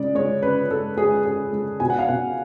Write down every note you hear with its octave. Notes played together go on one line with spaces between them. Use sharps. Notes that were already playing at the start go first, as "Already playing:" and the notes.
Already playing: C#3 G#3 D5
G#3 C#5
C#3 B4
G#3 A4
G#3 G#4
C#3 G#4
G#3
B2 G#5
F#5
F5
B2 F#5